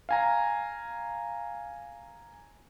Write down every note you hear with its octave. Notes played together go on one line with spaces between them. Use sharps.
F5 G#5 A#5